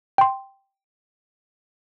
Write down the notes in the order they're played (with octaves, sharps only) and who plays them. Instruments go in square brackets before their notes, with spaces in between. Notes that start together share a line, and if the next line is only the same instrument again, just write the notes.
[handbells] G5 C6